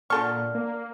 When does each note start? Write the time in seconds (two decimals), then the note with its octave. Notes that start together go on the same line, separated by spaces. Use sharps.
0.10 A#2 D3 A4 C#6 F6
0.55 A#3